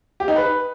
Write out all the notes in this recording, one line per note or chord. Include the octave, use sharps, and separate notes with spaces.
G4
D#4
B4